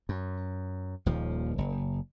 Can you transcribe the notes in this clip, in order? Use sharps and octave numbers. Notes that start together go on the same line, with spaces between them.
F#2
D#1 D#2 F3
F#1